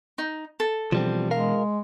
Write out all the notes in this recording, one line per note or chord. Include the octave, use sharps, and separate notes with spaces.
D#4
A4
B2 E3 F3 G3 C4
G#3 A#4 F5